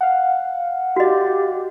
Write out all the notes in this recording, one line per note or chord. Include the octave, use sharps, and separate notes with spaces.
F5 F#5
F#4 G4 D#5